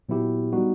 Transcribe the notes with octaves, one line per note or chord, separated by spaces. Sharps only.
A#2 F#3 B3 E4 G4
G3 B3 D#4 F#4